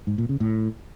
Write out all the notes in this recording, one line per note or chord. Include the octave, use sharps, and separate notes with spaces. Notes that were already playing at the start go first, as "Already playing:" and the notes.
G#2
A#2
C#3
A2